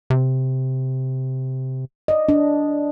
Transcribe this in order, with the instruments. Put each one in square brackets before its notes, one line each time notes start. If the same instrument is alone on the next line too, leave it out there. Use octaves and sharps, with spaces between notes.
[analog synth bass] C3
[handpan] D5 D#5
D4